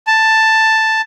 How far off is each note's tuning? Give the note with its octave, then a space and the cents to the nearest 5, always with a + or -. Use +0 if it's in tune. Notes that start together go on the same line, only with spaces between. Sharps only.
A5 +5